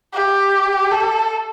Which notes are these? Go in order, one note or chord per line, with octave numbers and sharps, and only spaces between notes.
G4
A4